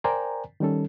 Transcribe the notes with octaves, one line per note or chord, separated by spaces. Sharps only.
A#4 C5 D5 G5 G#5 A#5
D#3 G3 C#4 A4